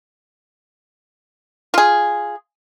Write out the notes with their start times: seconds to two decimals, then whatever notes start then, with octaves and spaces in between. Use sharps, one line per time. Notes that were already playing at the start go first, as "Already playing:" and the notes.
1.74 F4 G#4